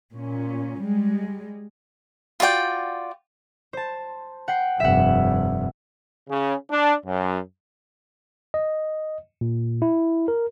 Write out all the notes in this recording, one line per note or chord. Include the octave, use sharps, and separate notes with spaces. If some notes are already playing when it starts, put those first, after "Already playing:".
A#2 C#4
G3 G#3
F4 F#4 D5 G5
C5 A5
F#5 G5 C7
F1 G2 E5 F#5
C#3
D4
F#2
D#5
A#2
E4
A#4